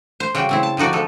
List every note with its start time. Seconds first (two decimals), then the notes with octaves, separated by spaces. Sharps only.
0.20 C5
0.35 C#3 G3 F#4 G5
0.49 C#3 C4 E4
0.63 A5
0.77 D3 F3 D#4 F#4 D5
0.93 F3 G#3 A4